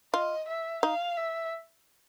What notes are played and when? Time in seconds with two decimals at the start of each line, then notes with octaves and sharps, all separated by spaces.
0.13 F4 D#5
0.48 E5
0.83 D#4 F5
1.17 E5